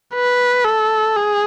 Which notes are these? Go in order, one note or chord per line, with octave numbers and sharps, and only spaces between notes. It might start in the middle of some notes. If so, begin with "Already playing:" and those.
B4
A4
G#4